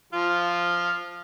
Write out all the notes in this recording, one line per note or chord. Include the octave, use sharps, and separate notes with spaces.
F3 F4